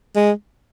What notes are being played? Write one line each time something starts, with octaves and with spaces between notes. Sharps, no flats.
G#3